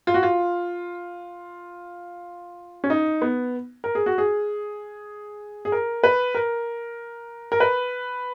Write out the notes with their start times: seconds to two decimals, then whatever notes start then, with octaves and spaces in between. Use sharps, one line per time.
0.07 F4
0.14 F#4
0.23 F4
2.84 C#4
2.90 D#4
3.22 B3
3.84 A#4
3.95 G#4
4.06 F#4
4.18 G#4
5.65 G#4
5.72 A#4
6.04 B4
6.35 A#4
7.52 A#4
7.60 B4